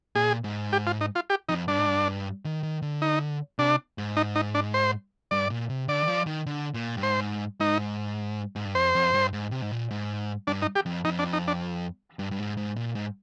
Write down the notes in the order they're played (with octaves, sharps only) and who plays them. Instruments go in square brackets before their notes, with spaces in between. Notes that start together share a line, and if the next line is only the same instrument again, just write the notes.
[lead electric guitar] A#2 [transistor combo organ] G#4
[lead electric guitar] G#2
[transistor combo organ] G4
F4
D#4
F4
G4
[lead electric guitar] F2 [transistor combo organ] D#4
[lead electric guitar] G2 [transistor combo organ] D4
[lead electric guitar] G#2
G2
D#3
D#3
D3
[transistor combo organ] D#4
[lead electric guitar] C3 [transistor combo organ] D4
[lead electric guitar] G#2
[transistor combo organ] D#4
D#4
D4
C5
[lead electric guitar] G2 [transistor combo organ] D5
[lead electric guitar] A#2
C3
[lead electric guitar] D3 [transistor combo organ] D5
[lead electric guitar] D#3
F3
D#3
D3
A#2
G2
[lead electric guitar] G#2 [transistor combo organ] C5
[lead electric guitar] G#2 [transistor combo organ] D#4
[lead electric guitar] G#2
G2
[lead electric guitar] F2 [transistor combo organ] C5
[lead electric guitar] F2
G2
G#2
C3
G#2
A#2
G#2
[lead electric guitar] G2 [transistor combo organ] D4
[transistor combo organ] D#4
G4
[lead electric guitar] F2
[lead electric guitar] F2 [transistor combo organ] D#4
[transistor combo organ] D4
D#4
D4
[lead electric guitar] G2
G2
G#2
G#2
A#2
G#2